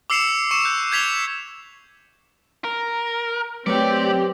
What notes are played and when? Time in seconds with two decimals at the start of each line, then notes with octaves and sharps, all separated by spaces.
0.10 D6 E6 C7 C#7 E7 F7
0.51 C#6 C#7 E7
0.65 F#6 G6
0.92 G6 G#6 B6 F7 G7
2.64 A#4
3.66 F#3 A3 C4 G4 B4 C#5 D5 D6